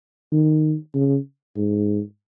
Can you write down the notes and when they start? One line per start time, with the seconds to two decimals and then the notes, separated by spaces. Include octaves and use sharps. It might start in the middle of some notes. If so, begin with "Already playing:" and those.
0.32 D#3
0.94 C#3
1.57 G#2